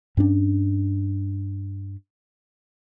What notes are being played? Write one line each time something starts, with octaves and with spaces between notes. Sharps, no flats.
G2 C#4 D4